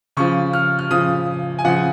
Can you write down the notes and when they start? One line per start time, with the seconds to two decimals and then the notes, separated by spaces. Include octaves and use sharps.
0.17 C#3 F3 C#6
0.53 F6
0.79 F6
0.91 C#3 F3 D#6
1.59 G#5
1.65 C#3 F3 F#5